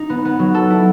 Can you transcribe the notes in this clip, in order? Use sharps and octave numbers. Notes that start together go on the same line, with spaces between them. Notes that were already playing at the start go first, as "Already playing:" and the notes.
Already playing: D#4
B3
B3
F#3
A4
E4